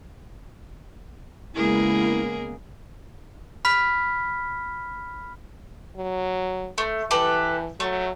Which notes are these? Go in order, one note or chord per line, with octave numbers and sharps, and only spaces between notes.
C#3 G#3 A#3 B3 E4 G#4 A#4
B5 F6 B6
F#3
A3
E3 G4 A4 B4
F#3 A3